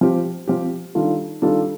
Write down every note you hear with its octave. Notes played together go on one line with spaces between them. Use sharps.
F3 C4 G4
F3 C4 G4
D#3 G3 D4 F4 A4
D#3 G3 D4 F4 A4